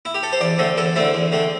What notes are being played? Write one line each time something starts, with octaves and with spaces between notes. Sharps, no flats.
E4
G4
A4
C5
E2 D5
D3 A3 C4
E2 A4
D3 A3 C4 E4
E2
D3 A3 C4